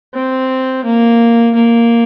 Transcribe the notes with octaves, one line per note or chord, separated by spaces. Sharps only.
C4
A#3
A#3